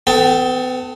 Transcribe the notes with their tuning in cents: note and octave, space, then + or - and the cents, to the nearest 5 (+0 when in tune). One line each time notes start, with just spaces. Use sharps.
B3 +40 A4 +10 G5 +5